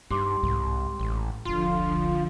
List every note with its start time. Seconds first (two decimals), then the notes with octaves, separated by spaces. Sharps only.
0.11 G2 D#4 G4 C6 D6
0.43 C2 G#2
1.00 A1
1.45 E1 C2 D3 F3 F4 C6